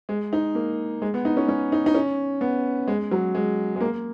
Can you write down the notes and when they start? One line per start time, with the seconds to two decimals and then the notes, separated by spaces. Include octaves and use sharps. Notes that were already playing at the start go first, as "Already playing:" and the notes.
0.09 G#3
0.33 D#4
0.55 A#3
1.02 G#3
1.14 B3
1.25 D#4
1.37 C#4
1.48 C#4
1.72 D#4
1.86 D#4
1.94 C#4
2.41 B3
2.87 G#3
3.11 F#3
3.35 G#3
3.76 G#3
3.81 A#3